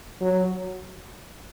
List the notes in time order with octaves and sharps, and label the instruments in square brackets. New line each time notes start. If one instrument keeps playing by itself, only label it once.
[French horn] F#3